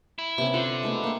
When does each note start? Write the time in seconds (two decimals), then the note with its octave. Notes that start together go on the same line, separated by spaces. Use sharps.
0.19 E4
0.38 C3 B3 C#4 E5
0.54 D3 F4 C5
0.83 G#3 A3 B3
1.04 A#3 G5